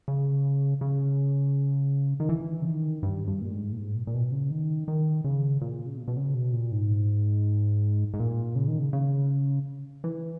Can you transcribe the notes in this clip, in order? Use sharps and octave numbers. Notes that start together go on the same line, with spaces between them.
C#3
C#3
D#3
E3
C#3
D#3
G2
G2
A#2
G#2
A#2
G#2
A#2
A#2
B2
C#3
D#3
D#3
C#3
A#2
C#3
B2
B2
C#3
B2
A#2
G#2
G#2
A#2
C#3
D#3
C#3
C#3
E3